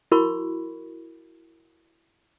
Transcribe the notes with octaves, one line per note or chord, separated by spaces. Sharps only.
E4 F#4 A#4 B5 C#6